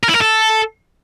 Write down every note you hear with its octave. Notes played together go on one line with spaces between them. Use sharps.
A#4
E4
A#4
A4